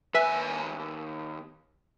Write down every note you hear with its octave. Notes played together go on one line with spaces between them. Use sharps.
D#2 B4 E5 G#5